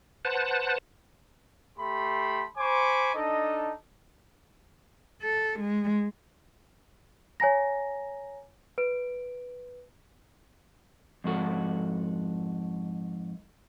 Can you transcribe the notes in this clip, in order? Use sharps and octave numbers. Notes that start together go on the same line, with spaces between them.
B4 C5 F#5 A5
A3 G4 B5 C6
C5 G#5 B5 C#6 D6
D4 D#4 A4 D#5
A4
G#3
C#5 G#5 A#5 A#6
B4 D7
F2 G#2 F#4 A4